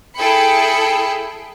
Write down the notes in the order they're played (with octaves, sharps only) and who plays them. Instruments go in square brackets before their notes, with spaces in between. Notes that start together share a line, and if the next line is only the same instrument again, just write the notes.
[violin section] E4 G#4 A4 G5 B5 C#7